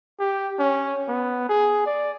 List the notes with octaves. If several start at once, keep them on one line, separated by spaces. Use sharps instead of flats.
G4
C#4
B3
G#4
D5